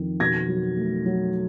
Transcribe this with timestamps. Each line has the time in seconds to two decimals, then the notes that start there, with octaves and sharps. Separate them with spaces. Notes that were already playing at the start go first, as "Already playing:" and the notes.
Already playing: F2 D#3
0.20 B2 G#6 A#6
0.49 F#3
0.77 A3
1.06 F#3